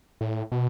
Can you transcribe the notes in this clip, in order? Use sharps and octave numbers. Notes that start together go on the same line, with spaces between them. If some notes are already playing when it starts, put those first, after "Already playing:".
A2
B2